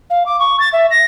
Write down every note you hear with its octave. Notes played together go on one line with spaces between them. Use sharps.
F5
D6
C#6
A6
E5
A#6